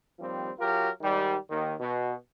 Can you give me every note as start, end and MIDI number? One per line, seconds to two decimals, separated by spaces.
0.20 0.49 39
0.20 0.49 53
0.20 0.49 55
0.20 0.49 60
0.59 0.88 54
0.59 0.88 65
0.59 0.88 67
0.59 0.88 70
1.01 1.35 44
1.01 1.35 51
1.01 1.35 55
1.50 1.73 39
1.50 1.73 51
1.79 2.13 47